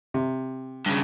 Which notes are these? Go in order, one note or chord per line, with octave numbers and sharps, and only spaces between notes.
C3
G2 C#3